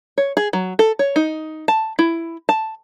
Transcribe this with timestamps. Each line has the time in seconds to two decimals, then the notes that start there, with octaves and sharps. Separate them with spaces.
0.18 C#5
0.37 G#4
0.53 F#3
0.79 A4
0.99 C#5
1.16 D#4
1.68 A5
1.99 E4
2.49 A5